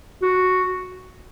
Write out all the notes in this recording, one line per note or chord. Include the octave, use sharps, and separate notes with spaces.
F#4